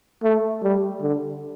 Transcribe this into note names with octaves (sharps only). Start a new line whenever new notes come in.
A3
G3
D3